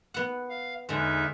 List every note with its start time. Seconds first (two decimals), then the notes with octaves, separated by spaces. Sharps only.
0.14 B3 F#5
0.49 F5
0.89 E2 D3 G#3 D#4 E5